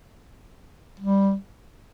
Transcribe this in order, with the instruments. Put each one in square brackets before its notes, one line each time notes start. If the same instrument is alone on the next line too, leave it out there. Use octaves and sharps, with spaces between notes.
[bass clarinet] G3